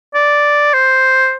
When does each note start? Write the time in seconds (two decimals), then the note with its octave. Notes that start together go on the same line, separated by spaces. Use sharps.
0.14 D5
0.74 C5